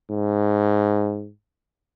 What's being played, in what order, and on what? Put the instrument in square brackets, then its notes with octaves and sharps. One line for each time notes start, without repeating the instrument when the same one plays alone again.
[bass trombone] G#2